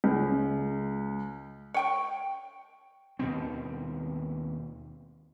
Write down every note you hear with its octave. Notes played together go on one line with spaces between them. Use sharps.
C#2
C#5 G5 C#6
D#2 B2 D#3 C4